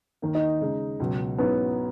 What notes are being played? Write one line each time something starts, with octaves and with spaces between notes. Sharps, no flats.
D#2 D#3 A#3
D#4
C#3 G#3 D#4
C#2 B2 F#3
G#2 F#3 B3 C#4 E4